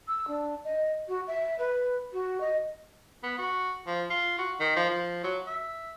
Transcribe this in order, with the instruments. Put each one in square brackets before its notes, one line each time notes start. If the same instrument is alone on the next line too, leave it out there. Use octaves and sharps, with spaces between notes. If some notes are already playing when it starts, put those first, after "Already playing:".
[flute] E6
D4
D#5
F#4
E5
B4
F#4
D#5
[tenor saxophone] B3
F#4
F3
F4
F#4
D#3
F3
F3
F#3
E5